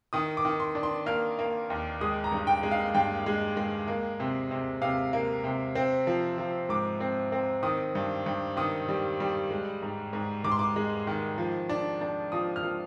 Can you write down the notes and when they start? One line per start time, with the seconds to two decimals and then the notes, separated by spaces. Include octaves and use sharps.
0.13 D#3 D#6
0.37 D6
0.45 D#3
0.60 C6
0.75 D4
0.83 C6
1.06 A#3 F6
1.39 A#3
1.70 D#2
2.01 G#3 D#6
2.24 A#5
2.32 G2
2.47 G5
2.63 G#3
2.71 F5
2.94 G2 G5
3.26 G#3
3.57 G#3
3.88 A#3
4.20 C3
4.51 C3
4.82 C3 F5
5.13 A#3
5.44 C3
5.75 C4
6.07 F3
6.38 F3
6.69 G#2 D6
7.00 C4
7.32 C4
7.63 D#3 D#6
7.95 G2
8.26 G2
8.57 D#3 D#6
8.88 G3
9.20 G3
9.50 G#3
9.82 G#2
10.13 G#2
10.44 G#2 D6
10.52 C6
10.59 D6
10.76 G#3
11.07 D#3
11.38 F3
11.69 D4
12.02 D4
12.32 F3 D#6
12.56 F6
12.63 F3